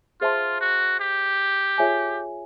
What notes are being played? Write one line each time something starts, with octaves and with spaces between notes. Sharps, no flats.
F4 G#4 C5 E5 A5 C6
F#4
G4
F4 G#4 C#5 E5 G#5